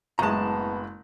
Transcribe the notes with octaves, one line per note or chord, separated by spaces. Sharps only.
F#1 A2 G#3 B3 A5 A#5